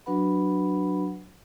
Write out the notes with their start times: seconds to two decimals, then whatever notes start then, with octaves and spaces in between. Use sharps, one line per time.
0.06 F#3 D4 F#4 B4 F#5 B5